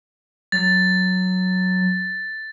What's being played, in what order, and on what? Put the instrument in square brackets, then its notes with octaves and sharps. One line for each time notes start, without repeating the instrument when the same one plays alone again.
[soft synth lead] F#3 [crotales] A6